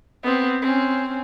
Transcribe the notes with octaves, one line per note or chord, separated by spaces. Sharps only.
B3 C4
C4 C#4